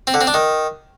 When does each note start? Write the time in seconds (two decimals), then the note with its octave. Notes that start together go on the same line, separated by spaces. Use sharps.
0.07 C4
0.14 D3
0.21 C4
0.27 D4
0.34 D#3